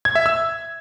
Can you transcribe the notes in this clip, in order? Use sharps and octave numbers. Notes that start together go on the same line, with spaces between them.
G#6
E5
E6